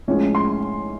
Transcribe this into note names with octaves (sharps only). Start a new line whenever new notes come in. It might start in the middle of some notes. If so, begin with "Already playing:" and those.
A2 F3 G#3 C#4
C6